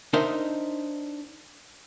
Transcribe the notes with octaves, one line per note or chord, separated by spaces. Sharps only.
D4 D#4 A#4 C5 D#5 E5